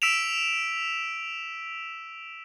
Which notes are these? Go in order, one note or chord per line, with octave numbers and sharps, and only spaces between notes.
E6 B6 D7 E7 F7